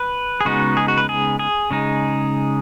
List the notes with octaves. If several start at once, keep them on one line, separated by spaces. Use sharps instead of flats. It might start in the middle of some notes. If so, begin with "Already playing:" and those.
Already playing: B4
G#4
C#3 G#3 B3 D#4 F#4
G#4
F#4
B4
G#4
G#4
C#3 G#3 D#4